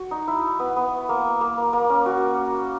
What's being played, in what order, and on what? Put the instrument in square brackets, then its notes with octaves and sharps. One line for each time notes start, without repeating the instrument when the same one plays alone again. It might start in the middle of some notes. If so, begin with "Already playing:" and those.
Already playing: [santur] F#4
D#4
E4
B3
B3
A#3
A#3
A#3
A#3
C#4
F#4